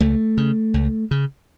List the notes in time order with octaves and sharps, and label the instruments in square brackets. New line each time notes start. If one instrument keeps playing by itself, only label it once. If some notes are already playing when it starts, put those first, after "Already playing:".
[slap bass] C#2 A3
C#3
C#2
C#3